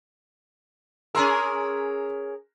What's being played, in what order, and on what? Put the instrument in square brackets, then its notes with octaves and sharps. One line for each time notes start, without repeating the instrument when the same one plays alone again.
[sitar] C#4 G#4 A#4 [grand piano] A#5 C6 E6